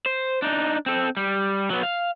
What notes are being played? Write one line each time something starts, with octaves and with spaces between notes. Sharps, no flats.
C5
D4 D#4
C4 A4
G3
F#3 B3
F5